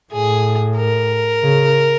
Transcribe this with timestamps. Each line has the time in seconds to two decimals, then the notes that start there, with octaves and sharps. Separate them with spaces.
0.12 A2 G#4
0.77 A#4
1.43 C#3